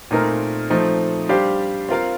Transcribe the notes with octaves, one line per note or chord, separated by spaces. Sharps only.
A#2 A3 C4 D#4 A#4
F3 A3 C4 D#4
G3 D4 G4 C5 F5
C4 F4 A#4 F5